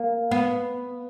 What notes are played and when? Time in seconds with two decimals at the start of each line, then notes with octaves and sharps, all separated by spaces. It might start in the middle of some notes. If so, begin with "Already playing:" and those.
Already playing: A#3
0.31 B3